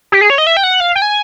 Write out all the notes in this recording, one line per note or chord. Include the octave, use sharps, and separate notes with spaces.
G4
G#4
C#5
D#5
E5
G5
F#5
F5
G5
G#5